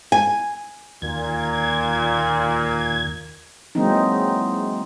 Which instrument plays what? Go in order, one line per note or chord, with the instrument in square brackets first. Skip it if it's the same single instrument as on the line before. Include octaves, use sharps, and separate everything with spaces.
[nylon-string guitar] G#5
[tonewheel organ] D#2 G#6 [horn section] A#2
[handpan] E3 F#3 G#3 A#3 C4 D#4